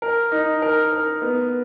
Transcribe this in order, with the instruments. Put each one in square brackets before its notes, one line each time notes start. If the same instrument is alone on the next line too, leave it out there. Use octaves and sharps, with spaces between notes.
[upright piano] A#4
D#4
A#4
A#4
B3